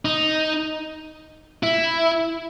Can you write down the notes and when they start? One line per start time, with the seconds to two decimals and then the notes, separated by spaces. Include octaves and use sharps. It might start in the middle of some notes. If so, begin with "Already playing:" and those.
0.05 D#4
1.63 E4